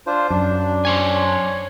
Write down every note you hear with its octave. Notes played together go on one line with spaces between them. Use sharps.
D4 F4 C5
F#2 D4
C5 C#5 G#5